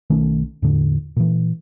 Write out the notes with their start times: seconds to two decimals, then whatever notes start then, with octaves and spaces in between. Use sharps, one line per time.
0.10 B1 D#3 A3 C#4
0.62 E2 A2 D3
1.17 A#2 E3